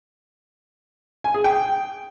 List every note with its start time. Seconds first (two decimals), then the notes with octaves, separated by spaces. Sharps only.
1.24 G#5
1.34 G#4
1.44 G5